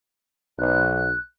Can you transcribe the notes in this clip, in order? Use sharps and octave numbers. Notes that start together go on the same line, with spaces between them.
B1 F#6